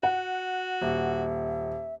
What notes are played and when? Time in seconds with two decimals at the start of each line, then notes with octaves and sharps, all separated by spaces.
0.03 F#4 F#5
0.82 D#1 E5